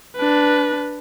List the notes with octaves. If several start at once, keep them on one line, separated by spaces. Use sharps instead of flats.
D4 B4